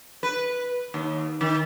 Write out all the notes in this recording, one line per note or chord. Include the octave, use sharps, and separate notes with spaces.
B4
D#2
D#3